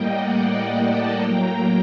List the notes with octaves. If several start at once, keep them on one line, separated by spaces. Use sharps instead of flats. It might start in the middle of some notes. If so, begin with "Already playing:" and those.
Already playing: A2 G3 A#3 D#5 G5
D5 F#5
D5 F#5
F#5 A5
A2 F#3 A#3 G5 A#5